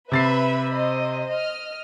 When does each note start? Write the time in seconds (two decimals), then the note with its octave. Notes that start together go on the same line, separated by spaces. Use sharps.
0.12 C3 B4 E5 B5 A6 C7
0.71 C5 D#5
1.30 D#5 F6